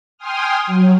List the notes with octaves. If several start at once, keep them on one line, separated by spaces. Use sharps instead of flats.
G5 G#5 C6 D#6 F6
F#3